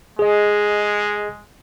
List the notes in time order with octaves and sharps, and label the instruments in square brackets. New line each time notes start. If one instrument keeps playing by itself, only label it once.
[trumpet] G#3 [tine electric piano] G#4 D#5